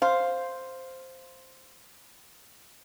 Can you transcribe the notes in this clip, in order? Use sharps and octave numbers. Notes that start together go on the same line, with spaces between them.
C5 F5